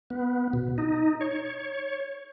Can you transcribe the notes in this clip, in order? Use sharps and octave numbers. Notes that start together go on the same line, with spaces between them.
B3
B2
D#4
C#5